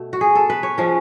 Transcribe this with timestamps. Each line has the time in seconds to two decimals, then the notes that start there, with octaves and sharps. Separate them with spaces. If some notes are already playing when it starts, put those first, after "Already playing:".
Already playing: B2 A3
0.13 F#4
0.21 G#4
0.35 A4
0.50 B4
0.63 C#5
0.78 F3 G#3 C#4